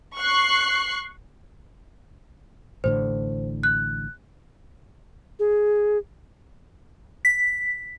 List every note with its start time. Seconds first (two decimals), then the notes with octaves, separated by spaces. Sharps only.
0.17 C#6 F#6 C7
2.84 A1 A2 D3 C5
3.63 F#6
5.39 G#4
7.25 B6